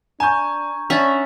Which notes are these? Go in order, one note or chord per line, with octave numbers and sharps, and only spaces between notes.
D4 G#5 A#5 C#6 G6
C#4 D4 E5 F#5 A6 B6 F7